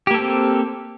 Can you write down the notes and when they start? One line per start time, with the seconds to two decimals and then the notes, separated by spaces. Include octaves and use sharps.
0.07 G4
0.11 A#3
0.14 A4
0.18 C4